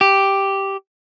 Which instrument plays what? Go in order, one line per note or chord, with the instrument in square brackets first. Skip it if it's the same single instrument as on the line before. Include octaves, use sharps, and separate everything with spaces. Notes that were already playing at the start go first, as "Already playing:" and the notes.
[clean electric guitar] G4